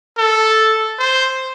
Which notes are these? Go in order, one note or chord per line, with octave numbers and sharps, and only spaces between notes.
A4
C5